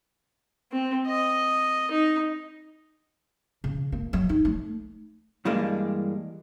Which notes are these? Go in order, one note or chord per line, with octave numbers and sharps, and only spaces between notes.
C4
D#5
D#4
C#3
A#3
F#3
D#4
A3
G2 E3 G3 G#3 A#3 D4